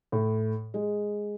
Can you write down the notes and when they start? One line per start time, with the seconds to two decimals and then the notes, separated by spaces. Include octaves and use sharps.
0.12 A2
0.74 G#3